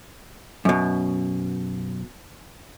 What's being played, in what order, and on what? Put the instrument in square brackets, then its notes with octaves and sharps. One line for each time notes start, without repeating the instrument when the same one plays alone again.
[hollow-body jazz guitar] F#2 B2